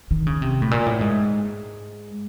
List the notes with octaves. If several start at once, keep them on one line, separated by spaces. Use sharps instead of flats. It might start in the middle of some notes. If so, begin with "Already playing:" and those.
D#3
C#3
C3
A2
A#2
A2
G#2